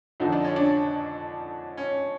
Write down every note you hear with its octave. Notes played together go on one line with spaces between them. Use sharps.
F2 D3 F3 D#4
D4
C#4
D4
C#4